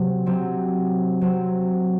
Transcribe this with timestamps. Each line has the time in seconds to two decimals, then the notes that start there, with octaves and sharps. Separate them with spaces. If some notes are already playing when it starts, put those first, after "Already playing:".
Already playing: C3 F#3 C4
0.26 C3 F#3 C4
1.21 C3 F#3 C4